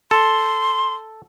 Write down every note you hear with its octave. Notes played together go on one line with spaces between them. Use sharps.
A4 C6